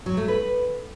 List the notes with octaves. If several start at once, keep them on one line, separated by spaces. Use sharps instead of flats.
F#3
A3
B4